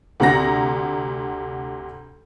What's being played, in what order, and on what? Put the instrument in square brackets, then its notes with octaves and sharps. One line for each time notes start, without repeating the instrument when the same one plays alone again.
[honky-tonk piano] D2 C3 F#5 A#5 A#6